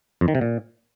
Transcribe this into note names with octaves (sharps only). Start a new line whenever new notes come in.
F2
D#3
C3
A#2